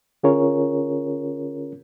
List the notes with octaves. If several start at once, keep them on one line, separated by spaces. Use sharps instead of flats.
D3 C#4 F4 G#4 A#4 C#5